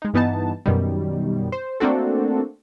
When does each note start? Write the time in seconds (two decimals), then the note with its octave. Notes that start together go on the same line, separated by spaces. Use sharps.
0.02 G#3 D#4
0.14 G2 E3 B3 D#4 A5
0.66 F#2 B2 D#3 G3
1.52 C5
1.80 A3 A#3 C4 D4 F#4 A4